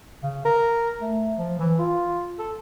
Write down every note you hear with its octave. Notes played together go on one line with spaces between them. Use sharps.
C#3
A#4
A3
F3
E3
F4
A4